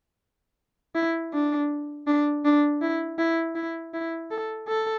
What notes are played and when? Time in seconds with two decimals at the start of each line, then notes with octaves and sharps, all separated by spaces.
0.95 E4
1.34 D4
2.07 D4
2.45 D4
2.82 E4
3.18 E4
3.55 E4
3.94 E4
4.31 A4
4.68 A4